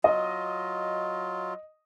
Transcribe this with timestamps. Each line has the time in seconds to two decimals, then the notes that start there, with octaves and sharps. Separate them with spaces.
0.04 F#3 F4 D#5